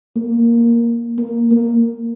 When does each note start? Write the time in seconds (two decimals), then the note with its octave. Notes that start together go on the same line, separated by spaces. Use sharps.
0.16 A#3
1.18 A#3
1.51 A#3